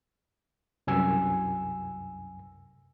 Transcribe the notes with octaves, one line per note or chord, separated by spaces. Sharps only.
C2 F#2 G#5 E6